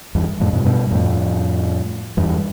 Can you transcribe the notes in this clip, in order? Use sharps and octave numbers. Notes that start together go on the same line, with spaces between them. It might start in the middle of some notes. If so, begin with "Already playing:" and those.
E2 G2
F2 A2
G2 B2
G2 B2
F2 A2
E2 G2